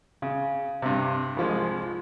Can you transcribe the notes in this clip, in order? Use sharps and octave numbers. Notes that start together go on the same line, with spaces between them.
C#3
G2 C3
C2 F3 G#3